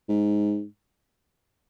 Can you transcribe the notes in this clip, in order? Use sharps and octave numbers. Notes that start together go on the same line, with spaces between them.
G#2